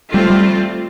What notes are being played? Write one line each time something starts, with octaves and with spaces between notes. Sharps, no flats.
G3 A3 C4 F4
G3